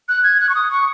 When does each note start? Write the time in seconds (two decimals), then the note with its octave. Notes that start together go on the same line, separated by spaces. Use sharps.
0.09 F#6
0.24 G#6
0.40 F#6
0.49 C#6
0.55 D#6
0.71 C#6